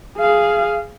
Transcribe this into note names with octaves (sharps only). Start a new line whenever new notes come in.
G#4 F5